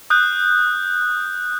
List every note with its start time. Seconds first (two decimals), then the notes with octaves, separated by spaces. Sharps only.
0.10 D#6 F#6 G6